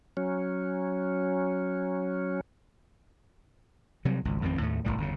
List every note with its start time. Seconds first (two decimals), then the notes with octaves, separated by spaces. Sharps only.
0.17 F#3 C#4
4.05 C3 F#3 G3
4.25 G#1 C#2
4.42 A1 F2 D#3 C4
4.60 D#2 A2 A3
4.85 F#1 D#2 A2 G3
4.98 G1 E2 A#2 C#3